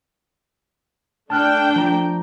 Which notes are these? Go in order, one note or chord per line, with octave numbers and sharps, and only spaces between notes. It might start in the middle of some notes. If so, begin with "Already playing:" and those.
A3 D4 G5 A5 F6 F#6
F3 A#5